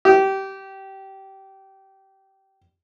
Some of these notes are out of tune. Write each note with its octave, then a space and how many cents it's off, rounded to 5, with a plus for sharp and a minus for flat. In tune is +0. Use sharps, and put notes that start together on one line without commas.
G4 -20